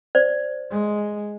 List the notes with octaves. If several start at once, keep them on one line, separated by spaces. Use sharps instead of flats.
C5 D5
G#3